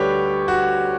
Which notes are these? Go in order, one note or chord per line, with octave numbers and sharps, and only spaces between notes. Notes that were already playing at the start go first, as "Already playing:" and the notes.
Already playing: D2 D3 G3 G4 B4 C#5 D5
F#4